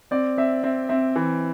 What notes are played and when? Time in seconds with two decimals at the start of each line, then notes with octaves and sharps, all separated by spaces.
0.11 C4 D5
0.37 C4 E5
0.63 C4 E5
0.89 C4 E5
1.16 E3